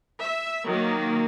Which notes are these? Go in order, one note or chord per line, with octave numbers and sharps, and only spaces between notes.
E5
D#3 F#3 A#3